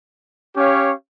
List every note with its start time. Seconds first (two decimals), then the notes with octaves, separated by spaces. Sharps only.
0.55 C#4 G4 C#5 F5